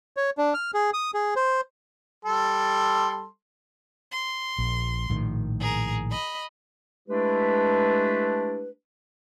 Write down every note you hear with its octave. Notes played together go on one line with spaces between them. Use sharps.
C#5
D4
F6
G#4
D#6
G#4
C5
G3 A4 C6
C6
A#1
A#1 A2 D#3
G#4 A#4
D#5 B5
G#3 A3 D4 E4 G4 B4